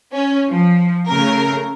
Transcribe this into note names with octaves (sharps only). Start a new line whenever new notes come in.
C#4
F3
C#3 A3 A#4